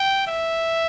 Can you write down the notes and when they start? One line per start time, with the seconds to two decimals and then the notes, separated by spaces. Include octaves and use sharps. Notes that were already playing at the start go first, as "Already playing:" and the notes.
Already playing: G5
0.27 E5